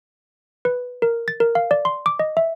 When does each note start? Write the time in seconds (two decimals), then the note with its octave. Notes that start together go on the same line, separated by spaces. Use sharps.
0.65 B4
1.02 A#4
1.28 A6
1.40 A#4
1.55 F5
1.71 D5
1.85 C6
2.06 D6
2.19 D#5
2.37 E5